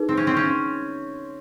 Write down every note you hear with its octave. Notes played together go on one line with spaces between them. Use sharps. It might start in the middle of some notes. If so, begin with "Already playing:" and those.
Already playing: D#4 G#4 B4
C4
C#4
C4
C#4